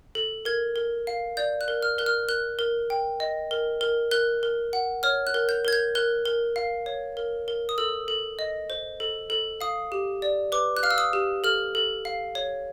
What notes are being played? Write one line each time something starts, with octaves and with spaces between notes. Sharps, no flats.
A4
A#4 G#6
A#4
F5
D5 G6
F#6
A#4
F6
A#4 F#6
F6
A#4 F#6
A#4
G5
D#5
A#4
A#4
A#4 F#6
A#4
F#5
C#5 F6
F#6
A#4
G6
A#4 G#6
G6
A#4 F#6
A#4
F5
C#5
A#4
A#4
D#6
A4 E6
A4
D#5
C5
A4
A4
F5 D#6
G4
D5
B4 D6
F#6
F5 F6
E6
D#6
G4
A4 F6
A4
F5
C#5